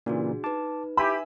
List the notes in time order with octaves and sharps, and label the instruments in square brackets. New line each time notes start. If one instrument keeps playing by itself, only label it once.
[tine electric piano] A#2 C#3 E3 [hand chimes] D4 F#4 G#4
[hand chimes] D#4 B4 [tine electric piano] A5 D6
[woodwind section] E4 G4 [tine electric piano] E5 G#5 E6 [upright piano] B5